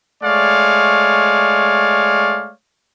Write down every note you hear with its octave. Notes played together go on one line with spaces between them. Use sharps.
G#3 A3 C#5 D5 F5